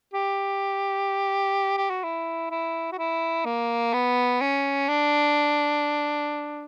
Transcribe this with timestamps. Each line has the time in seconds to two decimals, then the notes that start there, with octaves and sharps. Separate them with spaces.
0.14 G4
1.77 G4
1.90 F#4
2.04 E4
2.51 E4
2.92 F#4
2.98 E4
3.45 A#3
3.93 B3
4.41 C#4
4.89 D4